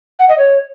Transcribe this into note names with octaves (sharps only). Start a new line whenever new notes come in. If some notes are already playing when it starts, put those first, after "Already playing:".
F#5
D#5
C#5